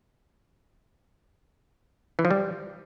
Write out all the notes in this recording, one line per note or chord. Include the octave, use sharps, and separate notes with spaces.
E3
F3
G3